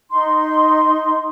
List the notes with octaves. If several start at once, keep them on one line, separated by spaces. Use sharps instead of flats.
D#4 C6